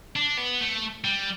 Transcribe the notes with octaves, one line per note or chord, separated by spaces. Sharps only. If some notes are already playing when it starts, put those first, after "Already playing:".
D4
B3
A3
G3